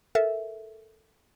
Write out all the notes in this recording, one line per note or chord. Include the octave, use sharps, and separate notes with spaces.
A4 A#4 E5